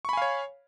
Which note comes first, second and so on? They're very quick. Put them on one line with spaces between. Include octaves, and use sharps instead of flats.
C#6 B5 G#5 F5 C#5